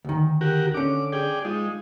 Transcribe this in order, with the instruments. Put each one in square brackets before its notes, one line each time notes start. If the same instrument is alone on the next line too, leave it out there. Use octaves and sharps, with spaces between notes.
[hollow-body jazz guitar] D2 D#3
[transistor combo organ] F#4 G4 A#4
[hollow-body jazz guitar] D3 C#4 [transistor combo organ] D6
[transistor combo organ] G#4 D5 G5
[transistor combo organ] G#3 D#4 [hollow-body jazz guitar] F4